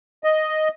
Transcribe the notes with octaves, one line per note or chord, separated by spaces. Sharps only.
D#5